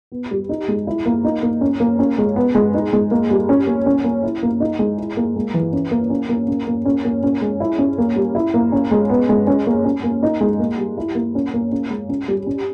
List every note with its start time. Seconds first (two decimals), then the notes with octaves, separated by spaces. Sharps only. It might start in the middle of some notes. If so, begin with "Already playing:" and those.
0.12 B3
0.31 G3
0.49 D#4
0.68 G#3
0.87 E4
1.06 A#3
1.25 D#4
1.43 A#3
1.61 C#4
1.80 A#3
1.99 C#4
2.18 G#3
2.36 B3
2.55 G#3
2.74 D#4
2.93 G#3
3.11 A#3
3.30 G3
3.49 C#4
3.67 A#3
3.86 C#4
4.04 A#3
4.23 E4
4.43 A#3
4.60 D#4
4.79 G#3
4.98 E4
5.17 A#3
5.36 G#3
5.54 E3
5.73 C#4
5.91 A#3
6.10 C#4
6.29 A#3
6.48 C#4
6.67 A#3
6.85 C#4
7.05 A#3
7.23 C#4
7.41 G#3
7.60 E4
7.79 C#4
7.98 A#3
8.16 G3
8.35 E4
8.54 A#3
8.72 C#4
8.91 G#3
9.09 B3
9.29 G#3
9.47 C#4
9.67 A#3
9.85 C#4
10.04 A#3
10.23 D#4
10.41 G#3
10.59 A#3
10.78 G3
10.97 E4
11.15 A#3
11.35 C#4
11.54 A#3
11.72 C#4
11.90 G#3
12.09 C#4
12.28 G3
12.46 C#4